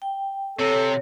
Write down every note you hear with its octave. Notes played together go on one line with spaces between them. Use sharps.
G5
C3 A4 C#5